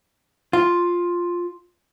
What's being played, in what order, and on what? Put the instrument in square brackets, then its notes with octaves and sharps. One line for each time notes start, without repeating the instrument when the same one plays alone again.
[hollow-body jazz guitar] F4